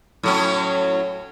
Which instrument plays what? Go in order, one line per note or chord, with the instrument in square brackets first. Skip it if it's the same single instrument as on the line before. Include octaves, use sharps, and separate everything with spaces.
[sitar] A2 F#3 C#4